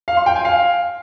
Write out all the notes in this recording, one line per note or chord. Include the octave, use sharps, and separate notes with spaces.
F5
C6
G5
G#5
F5